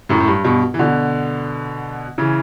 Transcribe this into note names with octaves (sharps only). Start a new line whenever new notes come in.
F#2 A2
A2
G2
G2 B2
E3
B2 D3
C#3 E3